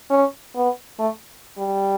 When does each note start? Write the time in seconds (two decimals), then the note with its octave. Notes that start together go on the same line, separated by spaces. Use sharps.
0.10 C#4
0.56 B3
0.99 A3
1.58 G3